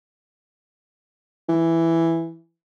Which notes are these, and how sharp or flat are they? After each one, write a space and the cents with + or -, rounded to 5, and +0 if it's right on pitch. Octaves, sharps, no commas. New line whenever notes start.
E3 +5